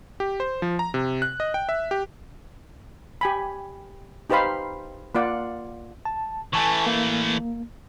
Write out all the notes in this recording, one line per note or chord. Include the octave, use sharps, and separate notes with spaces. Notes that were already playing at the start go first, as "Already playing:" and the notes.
G4
C5
F3
A#5
C3
F#6
D#5
G5
E5
G4
G4 G#5 B5
D#4 G4 B4 C5 F5 B5
A#3 F4 D5 F#5
A5
E3 A3 G#5 A5 C#6
A#3